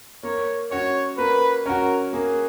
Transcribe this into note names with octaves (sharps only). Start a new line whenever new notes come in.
A#3 C#5
C#4 F#4 C#5
A#3 B4
C#4 F#4 A#4
A#3 G#4